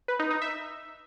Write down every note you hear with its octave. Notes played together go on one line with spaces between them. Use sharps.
B4
D#4
D#4
E5